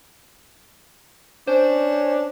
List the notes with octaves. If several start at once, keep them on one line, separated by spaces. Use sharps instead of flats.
C#4 D4 C5